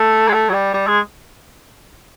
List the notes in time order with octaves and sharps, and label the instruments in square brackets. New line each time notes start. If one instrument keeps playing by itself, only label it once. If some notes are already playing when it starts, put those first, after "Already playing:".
Already playing: [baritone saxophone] A3
G#3
A3
F#3
G3
G3
G#3